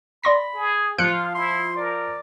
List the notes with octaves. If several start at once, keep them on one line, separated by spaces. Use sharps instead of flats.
D5 B5 C6 A#6
G#4
F3 F4 F5 F#6 C#7
E4 C6
A#4 D5